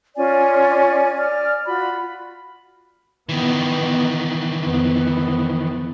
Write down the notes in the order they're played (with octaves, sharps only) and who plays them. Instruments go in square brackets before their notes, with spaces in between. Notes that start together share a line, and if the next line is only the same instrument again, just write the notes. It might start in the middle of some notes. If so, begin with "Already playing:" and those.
[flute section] C#4 F4 D5 G#5
D5 F6
F4 F#4 B5
[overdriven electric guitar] D#3 E3 [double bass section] B3
[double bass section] F2 B3